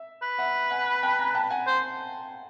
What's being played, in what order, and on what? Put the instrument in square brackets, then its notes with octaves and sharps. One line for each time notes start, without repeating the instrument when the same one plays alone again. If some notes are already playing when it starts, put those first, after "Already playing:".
Already playing: [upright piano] E5
[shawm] B4
[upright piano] E5 F#5
F#5 G#5
G5 A5
G#5 A#5
G5 A5
F#5 G#5
[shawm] C5